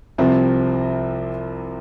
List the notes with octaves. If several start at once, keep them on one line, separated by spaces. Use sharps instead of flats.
C2 C3 F3 C4